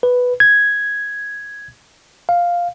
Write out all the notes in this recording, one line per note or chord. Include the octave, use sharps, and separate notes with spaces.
B4
G#6
F5